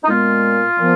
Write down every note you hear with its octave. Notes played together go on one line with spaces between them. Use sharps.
D#4
A#2 G#3 B3 F4
A#2 F3 B3